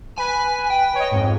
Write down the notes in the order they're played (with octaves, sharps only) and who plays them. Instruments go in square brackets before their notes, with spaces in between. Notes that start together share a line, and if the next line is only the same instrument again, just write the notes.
[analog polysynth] B4 [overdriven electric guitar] G#5
[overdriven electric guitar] G5
[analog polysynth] C#5 D#5
F2 G#2